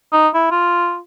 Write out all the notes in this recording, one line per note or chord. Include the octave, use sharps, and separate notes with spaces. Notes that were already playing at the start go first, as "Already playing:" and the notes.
D#4
E4
F4